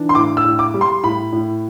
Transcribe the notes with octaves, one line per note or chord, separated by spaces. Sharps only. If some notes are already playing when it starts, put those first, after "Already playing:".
Already playing: E3 D4
C6
A2 D6
E6
A2
D6
G3
C6
A2 B5
A2